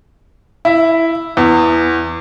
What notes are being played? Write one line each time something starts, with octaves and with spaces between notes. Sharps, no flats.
E4
E2